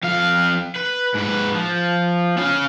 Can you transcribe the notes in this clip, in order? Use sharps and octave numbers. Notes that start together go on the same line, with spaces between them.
F2 F5
B4
G#2 B4
F3
C#4 F5